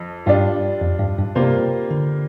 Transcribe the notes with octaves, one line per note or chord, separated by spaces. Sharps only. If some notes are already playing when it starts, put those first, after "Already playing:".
Already playing: F2
G2 G3 D4 F4
F2
G2
G2
C3 G3 A#3 F4 C5
D3